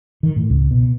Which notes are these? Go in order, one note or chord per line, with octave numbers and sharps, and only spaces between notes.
D#3
A2
C#2
B2